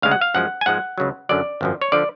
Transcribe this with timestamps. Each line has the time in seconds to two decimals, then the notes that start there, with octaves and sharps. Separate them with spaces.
0.02 D2 C#3 G#3 F5
0.11 F#5
0.21 F5
0.34 F#2 F3 G#3 F#5
0.61 G#5
0.66 G#2 F3 G#3 F#5
0.98 C#2 C#3 F#3
1.29 F#2 D3 F#3 D5
1.61 G#1 F#2 F3
1.82 C#5
1.92 D3 F3 D5